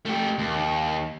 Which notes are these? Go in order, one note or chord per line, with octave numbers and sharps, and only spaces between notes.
A3 G4
D#2